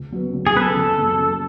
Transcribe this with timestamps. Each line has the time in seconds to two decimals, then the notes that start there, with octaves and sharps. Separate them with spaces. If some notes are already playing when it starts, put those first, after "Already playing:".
Already playing: C#2
0.11 C#3 F#3 B3
0.33 C#2
0.47 G#4
0.55 C#3 F#3 B3 B4
0.62 A4
0.76 F#1
0.97 F#2 C#3
1.20 F#1